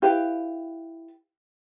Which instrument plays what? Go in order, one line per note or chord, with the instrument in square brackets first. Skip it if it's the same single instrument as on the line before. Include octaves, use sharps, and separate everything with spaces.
[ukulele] E4 G4 B4 F5